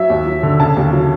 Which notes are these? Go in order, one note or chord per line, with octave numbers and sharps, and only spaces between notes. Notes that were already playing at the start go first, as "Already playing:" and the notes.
Already playing: F#3 E5
D#2
F#3
D3
C#3 A5
D#2
F#3